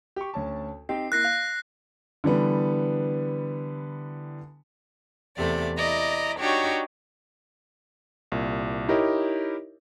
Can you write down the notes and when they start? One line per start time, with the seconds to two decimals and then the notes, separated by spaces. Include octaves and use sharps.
0.16 G4 C#6
0.34 D2 C#4 A5
0.89 C4 D#4 G4 C7
1.12 A#3 E4 F#6 A#6 C7
1.24 F5
2.24 D3 E3 G3 B3
5.37 E2 C3 A3 D5
5.77 E4 D5 D#5 A#5
6.38 D4 D#4 F#4 G4 C#5
8.32 C2 A#2
8.88 D#4 E4 G4 A#4 C#5 D#5